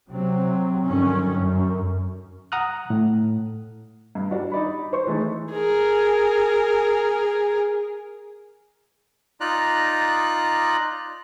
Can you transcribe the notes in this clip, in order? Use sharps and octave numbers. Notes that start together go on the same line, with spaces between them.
C3 F#3 C4
G2 D3 D#3 F#3 C#4
F#2
F#5 A#5 D#6 F6 F#6
A2
G2
G3 D4 F#4
D#4 D5 B5
C5 C6 C#6
E3 G#3 A3 D#4 A4 B4
G#4 A#4
D#4 F4 D5 A#5 F#6